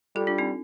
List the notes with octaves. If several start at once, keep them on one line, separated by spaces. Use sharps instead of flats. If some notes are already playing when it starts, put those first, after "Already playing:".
G3 F4 A4
D4 F4
C4 D#4